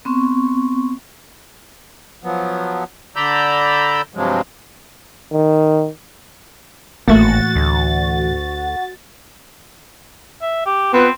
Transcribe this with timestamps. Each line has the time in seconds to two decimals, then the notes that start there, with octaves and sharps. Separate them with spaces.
0.05 B3 C4 C#6
2.24 F3 F#3 B3
3.16 D3 D5 A#5 B5 E6 G6
4.15 G2 C3 F3 F#3 G#3
5.33 D#3
7.08 G#1 A2 E3 A3 A#3 F#4 A6
7.56 D2
10.42 E5
10.66 G4
10.93 B3 C4 F4 B4